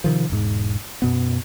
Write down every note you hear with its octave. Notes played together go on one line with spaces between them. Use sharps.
C3 D#3 F3
E1 G#2
F#2 B2 B3